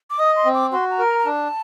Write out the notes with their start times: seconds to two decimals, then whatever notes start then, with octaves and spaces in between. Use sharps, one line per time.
0.10 D6
0.19 D#5 D#6
0.36 C6
0.45 C4
0.54 D6
0.72 F#4 C6
0.91 A#5
0.99 A#4
1.08 A#5
1.19 A#5
1.26 D4 A5